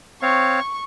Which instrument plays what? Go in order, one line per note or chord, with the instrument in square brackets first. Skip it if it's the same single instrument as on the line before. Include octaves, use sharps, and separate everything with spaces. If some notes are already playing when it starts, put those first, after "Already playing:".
[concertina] C4 C#5 F5 [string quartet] C#6